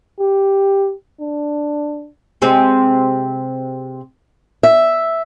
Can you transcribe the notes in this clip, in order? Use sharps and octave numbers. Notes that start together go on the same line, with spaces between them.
G4
D4
C3 G#3 C4
E5